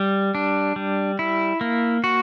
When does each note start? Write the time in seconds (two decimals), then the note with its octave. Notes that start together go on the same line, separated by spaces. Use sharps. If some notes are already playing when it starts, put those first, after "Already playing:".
Already playing: G3
0.35 D4
0.76 G3
1.19 E4
1.61 A#3
2.04 F#4